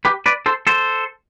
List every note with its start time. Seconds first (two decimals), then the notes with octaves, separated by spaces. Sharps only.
0.05 G4 B4
0.26 B4 D5
0.46 A4 C5
0.67 A4 C5